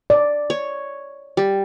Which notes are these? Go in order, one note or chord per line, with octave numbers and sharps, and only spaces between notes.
D5
C#5
G3